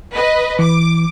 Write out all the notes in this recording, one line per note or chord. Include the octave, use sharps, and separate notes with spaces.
B4 D#5
E3 D6